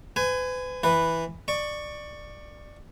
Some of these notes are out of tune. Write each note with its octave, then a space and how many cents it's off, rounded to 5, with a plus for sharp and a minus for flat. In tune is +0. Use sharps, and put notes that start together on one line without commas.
B4 +40 G#5 +0
E3 +0 B4 +0
D5 +20 C#6 +0